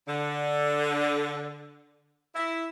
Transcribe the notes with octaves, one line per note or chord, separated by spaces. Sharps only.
D3
E4